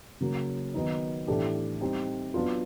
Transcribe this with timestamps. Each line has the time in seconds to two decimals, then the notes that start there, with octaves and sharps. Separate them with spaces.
0.21 C#3 F#3 A#3
0.74 D#3 F#3 B3 D#4
1.27 A2 E3 A3 D4 G4
1.81 G3 C4 D#4
2.34 F#3 B3 D4 F4